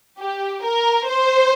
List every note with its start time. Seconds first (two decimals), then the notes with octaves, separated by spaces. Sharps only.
0.18 G4
0.63 A#4
1.08 C5